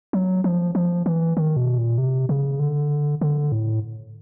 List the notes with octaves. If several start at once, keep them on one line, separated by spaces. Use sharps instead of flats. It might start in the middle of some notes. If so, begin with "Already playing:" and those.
F#3
F3
F3
E3
D#3
B2
A#2
C3
C#3
D3
D3
A2